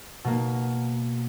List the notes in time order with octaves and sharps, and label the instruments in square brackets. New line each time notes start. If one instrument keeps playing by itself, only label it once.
[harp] B2 A#3